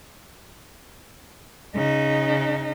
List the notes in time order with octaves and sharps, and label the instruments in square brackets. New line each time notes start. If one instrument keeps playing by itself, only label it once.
[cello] C#3 D#4